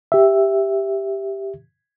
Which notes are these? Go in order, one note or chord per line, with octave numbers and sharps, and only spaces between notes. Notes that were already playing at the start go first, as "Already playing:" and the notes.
G4 E5